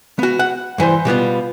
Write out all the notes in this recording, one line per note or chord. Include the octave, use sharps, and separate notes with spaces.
B3 F#4
F#5
G2 E3 B4 C5
B2 G3 B3 F4